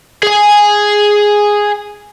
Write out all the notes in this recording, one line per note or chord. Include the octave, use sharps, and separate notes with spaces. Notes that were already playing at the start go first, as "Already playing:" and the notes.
G#4 G#5